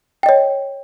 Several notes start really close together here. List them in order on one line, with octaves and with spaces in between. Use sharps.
G5 D#5 C#5